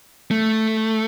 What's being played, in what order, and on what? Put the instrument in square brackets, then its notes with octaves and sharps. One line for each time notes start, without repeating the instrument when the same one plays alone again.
[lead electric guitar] A3